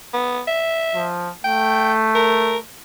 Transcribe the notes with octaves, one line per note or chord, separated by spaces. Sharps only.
B3
E5
F3
A3 G5
A#4